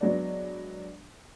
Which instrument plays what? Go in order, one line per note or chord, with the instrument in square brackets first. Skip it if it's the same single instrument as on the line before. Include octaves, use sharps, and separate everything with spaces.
[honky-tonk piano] F#3 G#3 B3 D4 D5